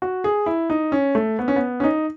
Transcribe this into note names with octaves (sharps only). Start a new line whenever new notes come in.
F#4
G#4
E4
D#4
C#4
A3
B3
C#4
B3
C#4
D#4